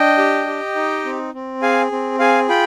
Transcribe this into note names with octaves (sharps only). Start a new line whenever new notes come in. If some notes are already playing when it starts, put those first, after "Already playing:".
Already playing: D4 D#5 G5
G4
G4
D#4
C4
C4
G#4 F5 G#5
C4
G#4 F5 G#5
F4 G5 B5